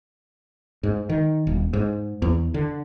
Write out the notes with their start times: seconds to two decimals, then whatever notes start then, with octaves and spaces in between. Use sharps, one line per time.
0.83 G#2
1.09 D#3
1.47 D#1
1.73 G#2
2.22 E2
2.54 D3